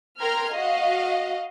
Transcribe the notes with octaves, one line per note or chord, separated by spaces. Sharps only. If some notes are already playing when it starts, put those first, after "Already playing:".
A#4 G5 A#5 C6 F6 G#6
F#4 D#5 F5